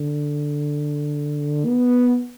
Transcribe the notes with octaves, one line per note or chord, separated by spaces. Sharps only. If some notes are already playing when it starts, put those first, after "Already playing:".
Already playing: D3
B3